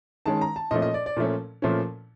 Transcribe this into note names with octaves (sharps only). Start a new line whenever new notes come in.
D#3 G#3 C#4 A5
A#5
A5
A#2 F3 A3 C#4 D#5
D#5
D5
D5
A#2 F3 A3 C#4
A#2 F3 A3 C#4